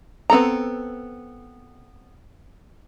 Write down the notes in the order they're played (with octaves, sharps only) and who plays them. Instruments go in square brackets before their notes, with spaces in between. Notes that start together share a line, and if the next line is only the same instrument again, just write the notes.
[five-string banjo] B3 C4 A4 A#5